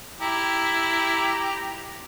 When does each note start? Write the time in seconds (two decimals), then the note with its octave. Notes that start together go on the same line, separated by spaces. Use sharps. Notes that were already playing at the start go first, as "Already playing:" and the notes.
0.21 E4 G4 A#5